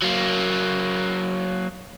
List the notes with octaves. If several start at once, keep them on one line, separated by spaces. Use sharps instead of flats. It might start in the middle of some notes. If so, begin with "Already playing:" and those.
F#3 A#3